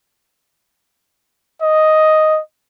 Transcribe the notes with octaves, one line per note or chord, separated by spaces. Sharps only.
D#5